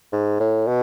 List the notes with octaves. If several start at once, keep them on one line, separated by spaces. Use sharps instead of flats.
G#2
A2
B2